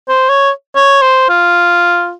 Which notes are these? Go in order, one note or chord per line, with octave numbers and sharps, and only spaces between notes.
C5
C#5
C#5
C5
F4